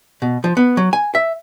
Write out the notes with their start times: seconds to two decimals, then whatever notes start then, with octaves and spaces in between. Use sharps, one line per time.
0.22 B2
0.44 F3
0.57 B3
0.77 F#3
0.93 G#5
1.15 E5